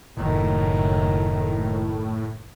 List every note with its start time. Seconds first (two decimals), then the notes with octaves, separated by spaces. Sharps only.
0.17 F#1 A2 D#3